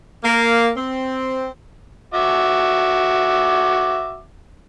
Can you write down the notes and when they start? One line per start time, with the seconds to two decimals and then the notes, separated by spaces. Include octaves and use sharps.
0.24 A#3
0.76 C4
2.14 F#4 E5 D6